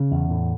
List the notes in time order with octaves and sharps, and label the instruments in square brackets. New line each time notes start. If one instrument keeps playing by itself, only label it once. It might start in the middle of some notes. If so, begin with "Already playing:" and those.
Already playing: [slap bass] C#3 C#4
E2
A2